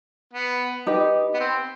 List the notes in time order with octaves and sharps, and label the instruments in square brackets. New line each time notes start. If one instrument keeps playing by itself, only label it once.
[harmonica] B3
[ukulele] D#4 G4 B4 D#5
[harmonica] B3
C4